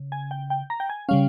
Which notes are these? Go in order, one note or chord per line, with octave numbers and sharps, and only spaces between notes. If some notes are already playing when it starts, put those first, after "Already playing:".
Already playing: C#3
G#5
G5
G5
A#5
G5
G#5
C#3 G3 C#4 F5